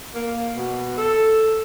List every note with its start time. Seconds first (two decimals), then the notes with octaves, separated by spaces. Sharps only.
0.15 A#3
0.55 B2
0.98 A4